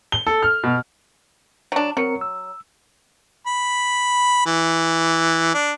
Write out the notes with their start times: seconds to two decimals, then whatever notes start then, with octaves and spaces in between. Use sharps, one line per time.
0.12 G7
0.27 A4
0.43 F6
0.63 B2
1.72 F#3 D4
1.97 F#3 C4 A#4 C#7
2.21 E6
3.47 B5
4.46 E3
5.54 D4